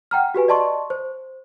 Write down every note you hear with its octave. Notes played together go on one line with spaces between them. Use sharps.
F#5 G5 A#5 F6
F#4 G4 B4 G#5
D5 D#5 A5 C6 C#6
C5